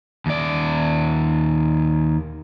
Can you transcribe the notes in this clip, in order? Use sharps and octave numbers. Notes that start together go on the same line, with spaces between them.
D#2 D5